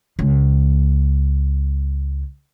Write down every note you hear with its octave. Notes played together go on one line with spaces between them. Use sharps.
C#2 G#3